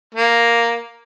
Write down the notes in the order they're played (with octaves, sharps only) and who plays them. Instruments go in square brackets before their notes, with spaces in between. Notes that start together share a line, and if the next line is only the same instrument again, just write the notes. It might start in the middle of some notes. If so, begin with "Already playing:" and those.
[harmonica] A#3